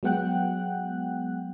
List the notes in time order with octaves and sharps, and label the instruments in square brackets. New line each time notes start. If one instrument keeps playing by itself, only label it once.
[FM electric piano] F#3 G#3 B3 F#5 G5 F#6